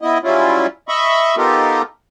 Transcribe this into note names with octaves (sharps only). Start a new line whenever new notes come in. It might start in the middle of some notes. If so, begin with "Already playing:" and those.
B3 E4 D#5
F#3 G3 C#4 E4 F4
D#5 E5 B5 C#6
B3 D#4 F4 G4 A4 A#4